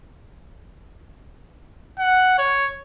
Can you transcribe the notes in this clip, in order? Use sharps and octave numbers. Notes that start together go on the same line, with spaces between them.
F#5
C#5